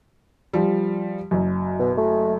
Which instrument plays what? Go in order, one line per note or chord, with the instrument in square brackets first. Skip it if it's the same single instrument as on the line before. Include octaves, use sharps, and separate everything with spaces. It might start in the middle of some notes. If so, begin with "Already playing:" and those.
[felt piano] F3 G3
F#1 F#2
[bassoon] B2
A3